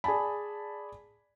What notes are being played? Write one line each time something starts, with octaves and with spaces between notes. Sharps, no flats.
G#4 D5 G#5 A5 B5